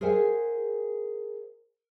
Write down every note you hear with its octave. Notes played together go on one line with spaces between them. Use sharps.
G#4 A#4 C5 E5 F#5 G#5